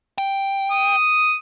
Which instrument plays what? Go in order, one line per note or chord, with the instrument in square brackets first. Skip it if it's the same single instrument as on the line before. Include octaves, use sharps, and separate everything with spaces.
[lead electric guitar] G5
[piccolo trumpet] D#6